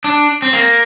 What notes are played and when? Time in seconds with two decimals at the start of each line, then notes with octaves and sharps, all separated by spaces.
0.04 D4
0.42 C4
0.53 A#3